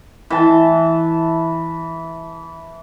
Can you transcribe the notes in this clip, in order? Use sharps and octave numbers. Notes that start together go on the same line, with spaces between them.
E3 A5